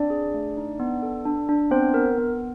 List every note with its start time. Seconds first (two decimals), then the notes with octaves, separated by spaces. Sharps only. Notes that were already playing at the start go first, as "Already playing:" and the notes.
Already playing: C4 D4 D5
0.10 G#4
0.34 A3
0.57 D#4
0.80 B3
1.03 A4
1.25 D4
1.49 D4
1.71 B3 C4 C5
1.94 B3 A#4
2.18 B3